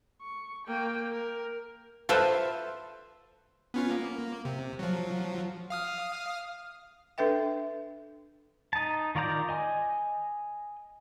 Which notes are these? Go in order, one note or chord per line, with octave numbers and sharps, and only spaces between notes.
C#6
A#3 G5
A#4
F4 A4 B4 C5 E5
B3 C#4 F4
A#3
C3
F3 F#3
F5 D#6 F6
D4 A4 B4 E5 G5
D#4 A5
D#3 F4 D5 A#5 G6
D#5 G#5